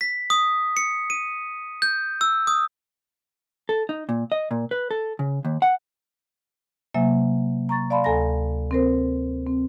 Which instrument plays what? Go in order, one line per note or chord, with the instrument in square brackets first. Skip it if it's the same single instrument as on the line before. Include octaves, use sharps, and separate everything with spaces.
[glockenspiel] B6
D#6
C#7
D#7
G6
E6
D#6
[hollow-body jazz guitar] A4
D#4
A#2
D#5
A#2
B4
A4
C#3
D#2
F#5
[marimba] C3 F#3 A#3 E5 G#5
A#5 C#6 A6
D5 F5 A5 B5 C6
D2 A4 G#5 A#5 A#6
C4 A#4 C5
C4